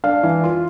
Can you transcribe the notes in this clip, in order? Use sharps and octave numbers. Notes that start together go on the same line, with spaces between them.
D4 F5
E3
F4